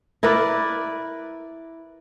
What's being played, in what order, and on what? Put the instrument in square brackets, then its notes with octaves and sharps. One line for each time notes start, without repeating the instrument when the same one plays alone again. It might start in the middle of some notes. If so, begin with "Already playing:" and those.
[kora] E4 A#4 B4 D5